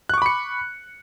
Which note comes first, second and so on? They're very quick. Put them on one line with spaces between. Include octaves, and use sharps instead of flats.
F#6 C#6 D6 B5 C#7